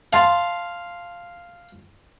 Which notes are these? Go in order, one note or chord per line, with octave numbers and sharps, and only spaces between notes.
F5 A5 C6